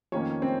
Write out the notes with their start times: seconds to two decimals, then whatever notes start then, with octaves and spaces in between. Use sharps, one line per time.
0.12 F2 D#3 A#3 C#4 C#5
0.42 C4 C5